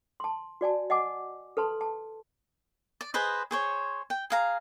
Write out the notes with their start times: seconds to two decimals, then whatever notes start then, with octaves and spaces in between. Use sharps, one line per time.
0.20 A5 C6
0.61 F#4 D5 G#5 A5
0.90 D#5 F#5 G#5 D6
1.57 A4 B4 A5 C6
1.81 A5
3.01 D5
3.14 G#4 B4 C5 D#5
3.51 G#4 C5 C#5
4.10 G5
4.30 G#4 F5 A#5